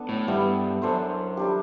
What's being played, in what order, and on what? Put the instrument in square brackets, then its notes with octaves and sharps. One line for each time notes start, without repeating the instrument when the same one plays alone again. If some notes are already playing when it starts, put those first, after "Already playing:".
Already playing: [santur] B3 D4 A4
[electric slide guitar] A2
[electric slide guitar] G2 [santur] G3 B3 E4
[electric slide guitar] F#2 [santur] D4 A4 C5
[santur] G3 D4 G4